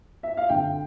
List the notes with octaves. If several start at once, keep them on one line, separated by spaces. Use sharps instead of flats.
E5
F5
D3 G5